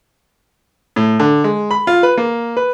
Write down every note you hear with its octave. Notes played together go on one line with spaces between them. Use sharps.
A2
D3
G#3
B5
F4
B4
A#3
B4